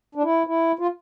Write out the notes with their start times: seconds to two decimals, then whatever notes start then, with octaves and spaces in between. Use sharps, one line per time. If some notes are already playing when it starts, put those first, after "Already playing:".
0.15 D4
0.23 E4
0.47 E4
0.79 F4